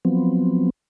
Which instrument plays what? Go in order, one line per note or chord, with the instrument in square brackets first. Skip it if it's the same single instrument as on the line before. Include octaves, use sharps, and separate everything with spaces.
[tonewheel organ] F3 F#3 B3 C4